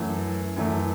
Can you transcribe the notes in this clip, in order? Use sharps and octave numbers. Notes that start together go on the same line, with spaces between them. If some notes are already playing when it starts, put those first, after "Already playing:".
Already playing: F#2 E3 A3
F#2 E3 A3